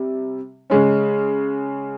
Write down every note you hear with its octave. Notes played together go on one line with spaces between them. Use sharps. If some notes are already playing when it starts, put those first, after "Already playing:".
Already playing: C3 G3
C#3 G#3 C#4